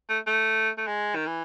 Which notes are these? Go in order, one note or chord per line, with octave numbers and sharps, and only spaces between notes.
A3
A3
A3
G#3
D#3
E3